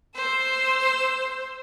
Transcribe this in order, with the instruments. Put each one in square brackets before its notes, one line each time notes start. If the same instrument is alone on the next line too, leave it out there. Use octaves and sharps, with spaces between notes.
[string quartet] C5 E6